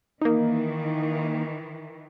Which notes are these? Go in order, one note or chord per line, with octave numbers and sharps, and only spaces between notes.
D#3 E3 A#3 D#4